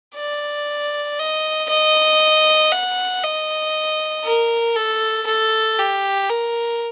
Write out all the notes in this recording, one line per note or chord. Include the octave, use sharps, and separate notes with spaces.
D5
D#5
D#5
F#5
D#5
A#4
A4
A4
G4
A#4